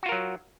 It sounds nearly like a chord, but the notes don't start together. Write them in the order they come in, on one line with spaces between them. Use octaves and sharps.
F#4 F4 A#4 F#3